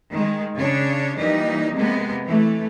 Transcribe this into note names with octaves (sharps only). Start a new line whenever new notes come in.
D#3 G#3
C#3 D4 C#5
E3 F3 G3 A#3 D#4
C3 G#3 A#3 B3
E3 A3